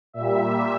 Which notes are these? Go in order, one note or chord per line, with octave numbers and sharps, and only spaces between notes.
A#2 G3 E5